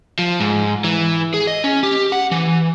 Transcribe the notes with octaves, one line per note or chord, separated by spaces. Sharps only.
F3
G#2
E3
G#4
D#5
C#4
G4
F#5
E3